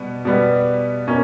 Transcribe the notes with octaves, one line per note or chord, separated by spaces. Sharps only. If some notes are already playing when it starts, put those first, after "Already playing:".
Already playing: B2 G3 B3
B2 G3 B3
B2 A#3 C#4